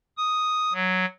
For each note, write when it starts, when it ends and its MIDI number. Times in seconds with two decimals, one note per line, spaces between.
0.17 0.73 87
0.73 1.06 54